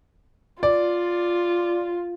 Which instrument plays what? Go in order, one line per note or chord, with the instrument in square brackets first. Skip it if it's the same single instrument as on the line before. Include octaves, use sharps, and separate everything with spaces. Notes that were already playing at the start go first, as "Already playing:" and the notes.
[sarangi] F4 [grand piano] D5